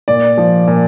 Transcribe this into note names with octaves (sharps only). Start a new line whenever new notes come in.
A#2 D5
F3
A#2